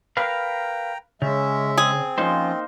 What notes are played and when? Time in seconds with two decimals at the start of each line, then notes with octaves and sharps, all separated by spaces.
0.17 A#4 B4 F5 G5 A#5
1.22 C#3 G#3 C#4 E5
1.78 C4 G#4
2.18 F3 A#3 C#4 D#4 F4 C5